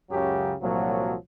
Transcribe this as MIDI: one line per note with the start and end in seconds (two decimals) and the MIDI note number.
0.10 0.53 37
0.10 0.53 42
0.10 0.53 49
0.10 0.53 54
0.10 0.53 67
0.60 1.13 36
0.60 1.13 46
0.60 1.13 53
0.60 1.13 54